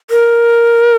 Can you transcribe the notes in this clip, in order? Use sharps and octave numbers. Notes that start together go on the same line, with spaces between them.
A#4